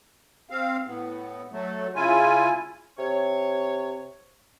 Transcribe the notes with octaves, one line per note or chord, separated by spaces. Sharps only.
C4 F5
A2 B3
F#3 A3
C#3 E4 F4 G#5
C3 C#5